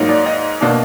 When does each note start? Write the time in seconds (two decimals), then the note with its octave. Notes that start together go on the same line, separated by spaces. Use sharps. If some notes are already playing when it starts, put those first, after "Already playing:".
Already playing: G#2 F#3 A#3 D#4
0.09 D5
0.26 D#5
0.61 B2 A#3 D4